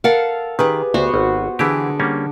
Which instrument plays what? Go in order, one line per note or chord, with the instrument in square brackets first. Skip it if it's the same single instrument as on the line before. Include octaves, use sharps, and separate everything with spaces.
[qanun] A4 F5 [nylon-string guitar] A#4 F#5
[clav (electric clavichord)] D#3 [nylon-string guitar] G4 G#4 B4
[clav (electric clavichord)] D2 [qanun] B3 F#4 C5
[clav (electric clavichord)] G#1
[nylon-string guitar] D3 G#4 [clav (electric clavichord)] E3 E4 G4
[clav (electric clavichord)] G3 A#3 C#4